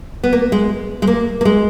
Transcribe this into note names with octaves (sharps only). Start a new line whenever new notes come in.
B3
A#3
G#3
G#3
A#3
A#3
G#3